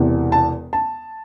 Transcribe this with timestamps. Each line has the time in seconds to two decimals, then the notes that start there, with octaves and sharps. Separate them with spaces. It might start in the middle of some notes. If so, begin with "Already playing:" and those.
Already playing: E1 E2 C3 E3
0.32 A5
0.73 A5